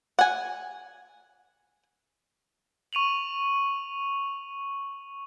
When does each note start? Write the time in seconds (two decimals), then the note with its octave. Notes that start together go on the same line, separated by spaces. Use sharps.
0.19 F#5 G#5
2.93 C#6 D#7 F7 F#7